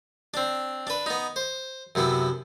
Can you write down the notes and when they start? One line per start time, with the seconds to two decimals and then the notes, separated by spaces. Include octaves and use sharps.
0.34 C4 D4
0.87 D4 B4
1.06 B3 D#4
1.36 C5
1.95 F#2 C3 B3 E4